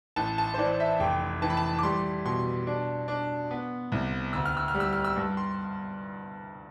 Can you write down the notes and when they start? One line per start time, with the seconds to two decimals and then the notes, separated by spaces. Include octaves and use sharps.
0.16 A1 A5
0.38 A5
0.54 C5
0.58 E3 D5
0.80 E5
1.00 F1 G5
1.42 E3 A5
1.50 B5
1.57 A5
1.79 D6
1.83 G3 C6
2.25 B2 C6
2.67 D4
3.08 D4
3.51 B3
3.92 C2
4.33 D2 E6
4.45 F6
4.57 E6
4.68 F6
4.75 G3
4.80 E6
4.93 F6
5.04 E6
5.16 G2
5.37 C6